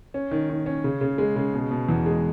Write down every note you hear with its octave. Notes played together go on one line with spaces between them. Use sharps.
C#4
D#3
D#3
C#4
C#3
C#3
G#3
C#3
B2
B2
E2
G#3